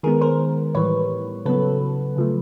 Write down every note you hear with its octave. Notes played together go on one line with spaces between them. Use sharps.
D#3 G#3 B3 G#4 A#4
A#4 C5
A2 E3 G3 B4 C#5
C#3 F#3 B3 A4 B4
C#3 F3 A3